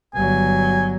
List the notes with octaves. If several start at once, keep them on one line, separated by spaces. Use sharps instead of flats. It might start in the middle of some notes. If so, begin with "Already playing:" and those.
G1 F#3 G#5